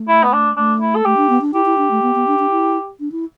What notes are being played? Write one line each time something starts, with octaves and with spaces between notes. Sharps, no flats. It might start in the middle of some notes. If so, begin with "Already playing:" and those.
Already playing: A3
E4
B3
D4
A3 D4
E4
A4
A3 G4
D4
B3
D4
E4 G4
E4
D4
A3
B3
B3
D4
D4
E4
D4
E4